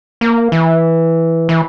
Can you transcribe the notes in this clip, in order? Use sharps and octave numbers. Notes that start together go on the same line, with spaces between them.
A#3
E3
E3